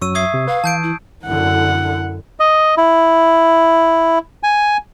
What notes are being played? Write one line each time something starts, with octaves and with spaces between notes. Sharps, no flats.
F#2 F#3 C#6 E6 D#7
E5 D#6 G#6 C7
C3
B4 F5
E3 A5 G6 D7
E4
F#2 D3 E4 F#5
D#5
E4
G#5